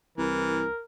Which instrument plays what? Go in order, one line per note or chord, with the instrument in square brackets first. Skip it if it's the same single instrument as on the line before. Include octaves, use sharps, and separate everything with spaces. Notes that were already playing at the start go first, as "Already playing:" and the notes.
[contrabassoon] C2 [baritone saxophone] E3 [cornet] A#4